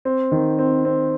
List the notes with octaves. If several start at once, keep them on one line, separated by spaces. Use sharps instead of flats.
C4
D#3
C4
C4